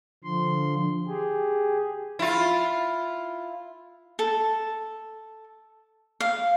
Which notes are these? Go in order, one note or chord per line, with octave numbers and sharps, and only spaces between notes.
D3 F3 C6
G4 G#4
E4 F4
A4
F5